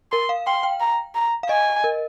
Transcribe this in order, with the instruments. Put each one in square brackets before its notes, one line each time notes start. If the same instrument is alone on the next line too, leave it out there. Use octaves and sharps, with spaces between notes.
[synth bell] A#4 [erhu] C6
[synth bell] F5
[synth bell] G5 [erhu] C6
[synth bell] G5
[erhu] A#5
A#5
[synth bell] F5
[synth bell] D#5 [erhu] G#5
[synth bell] A#4